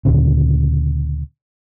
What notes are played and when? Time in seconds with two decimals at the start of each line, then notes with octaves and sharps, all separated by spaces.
0.05 D2 A#2 C#3